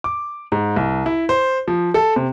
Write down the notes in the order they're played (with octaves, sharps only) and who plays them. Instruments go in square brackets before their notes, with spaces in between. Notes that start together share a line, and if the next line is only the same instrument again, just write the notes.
[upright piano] D6
G#2
C2
E4
C5
F3
A4
C3